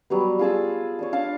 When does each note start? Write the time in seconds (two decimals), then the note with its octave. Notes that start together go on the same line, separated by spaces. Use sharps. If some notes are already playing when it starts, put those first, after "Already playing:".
0.10 F#3 G3 B3
0.39 F4 G#4 A5 E6
0.99 C#5 D5 A5
1.12 D4 F5 A5